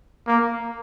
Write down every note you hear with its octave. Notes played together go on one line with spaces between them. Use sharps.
A#3